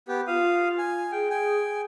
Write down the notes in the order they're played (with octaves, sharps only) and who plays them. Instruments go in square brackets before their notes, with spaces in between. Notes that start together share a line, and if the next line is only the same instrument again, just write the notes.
[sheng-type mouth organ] B3 G4 [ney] B4
[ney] F4 [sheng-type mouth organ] F5 D#6
[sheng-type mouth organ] G#5
[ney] G#4 [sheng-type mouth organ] G5
[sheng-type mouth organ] G5 G#5